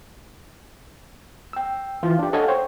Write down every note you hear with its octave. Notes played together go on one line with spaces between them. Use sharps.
G5 E6
E3 F4
D4 G4
A4 C#5 D#5 F5 F#5 G#5
C5 C#5 G5